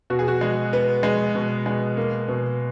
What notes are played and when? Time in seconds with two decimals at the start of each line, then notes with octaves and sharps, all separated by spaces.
0.10 B2 F#4
0.19 G#4
0.28 F#4
0.41 G#3
0.73 B3
1.03 G#3
1.35 B2
1.66 G#3
1.97 A#3
2.28 B2